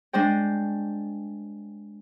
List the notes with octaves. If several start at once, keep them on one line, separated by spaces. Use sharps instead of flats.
G#3 D4 C5 G5